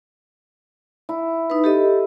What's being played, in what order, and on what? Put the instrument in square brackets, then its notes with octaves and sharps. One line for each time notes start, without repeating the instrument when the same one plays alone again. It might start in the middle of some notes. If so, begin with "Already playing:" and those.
[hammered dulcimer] E4
[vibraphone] D#4 B4
G4 A4 D#5